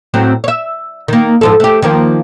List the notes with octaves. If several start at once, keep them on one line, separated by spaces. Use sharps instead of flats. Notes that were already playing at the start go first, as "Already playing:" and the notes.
A2 F#3 C4
C#5 E5
D#3 A#3
G#2 F3 A4
A3 G4
D#3 F3 A#3